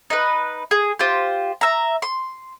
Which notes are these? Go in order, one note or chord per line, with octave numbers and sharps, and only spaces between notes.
D#4 B4
G#4
F4 G4 C5
E5 A#5
C6